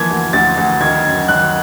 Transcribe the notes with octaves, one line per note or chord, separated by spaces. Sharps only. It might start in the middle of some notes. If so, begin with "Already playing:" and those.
Already playing: E3 F3 A#3 G#6
D2
D2 A6
D2
D#3 G#6
F#2
D#3 F#6